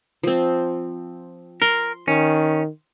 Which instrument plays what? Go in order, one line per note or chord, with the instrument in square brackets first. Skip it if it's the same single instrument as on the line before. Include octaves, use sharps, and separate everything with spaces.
[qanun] F3 C4
[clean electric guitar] A#4 [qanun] C6
[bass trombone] D#3 [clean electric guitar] C#4